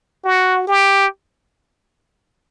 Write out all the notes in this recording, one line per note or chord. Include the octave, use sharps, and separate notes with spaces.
F#4
G4